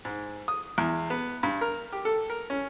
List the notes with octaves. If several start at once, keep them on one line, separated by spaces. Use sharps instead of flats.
G#2
D#6
E2
B3
G2
A#4
G4
A4
A#4
C#4